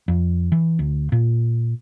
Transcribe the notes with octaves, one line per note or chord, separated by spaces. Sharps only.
F2
E3
D2
A#2